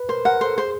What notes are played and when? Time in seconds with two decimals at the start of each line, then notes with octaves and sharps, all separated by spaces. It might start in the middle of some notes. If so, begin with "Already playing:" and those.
Already playing: B4
0.09 A#4 C5
0.25 A#4 F#5
0.41 A4 C5
0.57 G#4 C5